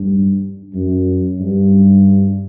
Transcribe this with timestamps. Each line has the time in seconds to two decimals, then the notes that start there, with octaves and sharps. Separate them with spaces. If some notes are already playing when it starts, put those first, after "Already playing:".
Already playing: G2
0.74 F#2
1.40 G2